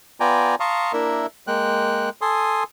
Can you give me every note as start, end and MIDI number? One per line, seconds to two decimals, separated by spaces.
0.20 0.55 59
0.20 0.55 65
0.20 0.55 74
0.20 0.55 79
0.20 0.55 80
0.20 0.55 82
0.60 0.92 77
0.60 0.92 81
0.60 0.92 82
0.60 0.92 84
0.60 0.92 85
0.60 0.92 87
0.93 1.26 58
0.93 1.26 62
0.93 1.26 64
0.93 1.26 70
0.93 1.26 76
1.47 2.10 56
1.47 2.10 58
1.47 2.10 79
1.47 2.10 90
2.21 2.64 69
2.21 2.64 80
2.21 2.64 84
2.21 2.64 87